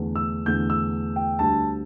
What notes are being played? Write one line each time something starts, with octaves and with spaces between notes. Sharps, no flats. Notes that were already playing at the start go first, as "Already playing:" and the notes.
Already playing: E2 D3 A3
E6
E2 D3 A3 G6
E6
G5
D2 D3 G3 A5